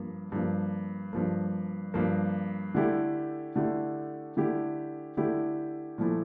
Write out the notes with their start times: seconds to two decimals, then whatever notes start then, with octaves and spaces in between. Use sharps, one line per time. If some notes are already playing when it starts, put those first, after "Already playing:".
Already playing: G2 F3 A#3
0.32 G2 F3 A#3
1.13 G2 F3 A#3
1.94 G2 F3 A#3
2.75 D3 A3 E4 G4
3.56 D3 A3 E4 G4
4.37 D3 A3 E4 G4
5.17 D3 A3 E4 G4
5.98 A#2 F3 A3 E4